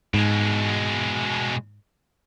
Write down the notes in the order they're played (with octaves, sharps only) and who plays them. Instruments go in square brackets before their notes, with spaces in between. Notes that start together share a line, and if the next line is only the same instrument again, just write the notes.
[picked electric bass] G#2 [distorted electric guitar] B2 G#3